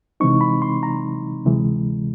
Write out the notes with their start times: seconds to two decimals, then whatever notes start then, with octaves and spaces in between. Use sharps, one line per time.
0.20 C3 E3 G#3 C4 D#4 C#6
0.41 B5
0.62 C6
0.83 A#5
1.45 D2 C3 E3 G#3